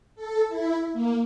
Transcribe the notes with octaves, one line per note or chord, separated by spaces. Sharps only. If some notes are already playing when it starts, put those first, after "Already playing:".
A4
E4
A#3